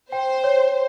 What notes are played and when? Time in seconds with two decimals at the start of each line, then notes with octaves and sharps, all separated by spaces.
0.12 C5 G5
0.44 C#5